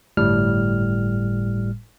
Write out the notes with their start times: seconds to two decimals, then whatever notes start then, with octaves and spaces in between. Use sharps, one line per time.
0.17 G1 A2 G3 F6